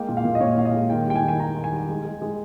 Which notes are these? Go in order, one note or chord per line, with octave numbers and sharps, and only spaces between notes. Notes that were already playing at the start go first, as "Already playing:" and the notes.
Already playing: G#3 A#3 G5
A#2
F5
A#2
D#5
A#2 C#5
A#2 F5
D#5
G#3
D#3 G5
G3 G5
G#5
D#3
G#5
D#3 A#5
D#3
G#5
G3
G#3
G#3
G#3